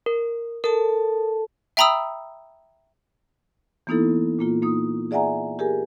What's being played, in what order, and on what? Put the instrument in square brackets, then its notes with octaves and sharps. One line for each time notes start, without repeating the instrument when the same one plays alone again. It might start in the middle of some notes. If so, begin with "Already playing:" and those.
[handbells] A#4
[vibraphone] A4 A5 [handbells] A#4
[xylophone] E5 G5 A#5 B5 D#6 E6
[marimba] E3 A#3 B3 D#4 E4 A4
A#2 A#3 F4
A#3 D#4 D#6
G#4 D5 E5 F#5 G#5 A#5
G4 G#4 A#4 G#5